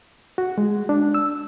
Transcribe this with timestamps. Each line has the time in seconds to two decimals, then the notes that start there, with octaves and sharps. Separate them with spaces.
0.38 F#4
0.58 G#3
0.89 D4
1.14 E6